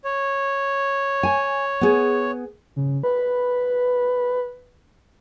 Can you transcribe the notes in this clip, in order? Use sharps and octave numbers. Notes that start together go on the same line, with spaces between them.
C#5
G#5
B3 G#4
C#3
B4